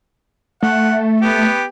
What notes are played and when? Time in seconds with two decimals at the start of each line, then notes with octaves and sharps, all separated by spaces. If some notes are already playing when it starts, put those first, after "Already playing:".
0.63 A3 F#5
1.21 B3 G4